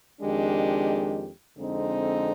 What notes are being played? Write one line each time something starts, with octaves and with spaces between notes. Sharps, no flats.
F2 D#3 G#3 D4 G4
F2 D3 G#3 C4 D#4